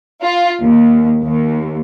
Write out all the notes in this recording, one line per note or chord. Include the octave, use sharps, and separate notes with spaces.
F4
D#2
D#2